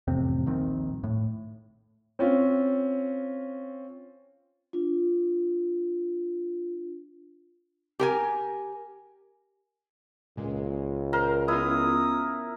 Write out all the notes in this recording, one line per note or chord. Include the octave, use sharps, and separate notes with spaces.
A1 F2 C3 C4
D#1 A#1 D#3 C4
A2
C4 C#4 F4
D4 F4
G4 A#4 G#5
C#2 A#2 G#3
A#4 C5
B3 C#4 E4 F4 D#6